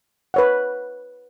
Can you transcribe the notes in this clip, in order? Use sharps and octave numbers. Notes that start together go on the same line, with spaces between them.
B4 C#5 F#5